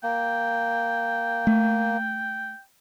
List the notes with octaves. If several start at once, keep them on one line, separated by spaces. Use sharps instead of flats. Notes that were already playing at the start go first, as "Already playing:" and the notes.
A#3 G5
A3